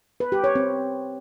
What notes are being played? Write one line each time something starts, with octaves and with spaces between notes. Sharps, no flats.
B4
G4
C#5
C4